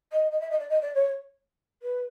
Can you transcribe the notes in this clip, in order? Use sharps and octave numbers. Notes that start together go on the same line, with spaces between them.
D#5
D#5
E5
D#5
D5
D#5
D5
C#5
B4